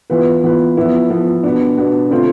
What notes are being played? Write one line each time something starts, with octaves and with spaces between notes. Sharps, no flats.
E3 B3 F4 B4
E3 B3 F4 B4
F3 B3 E4
F3 B3 E4
B2 B3 D4
B2 B3 D4
D3 A3 C4 F4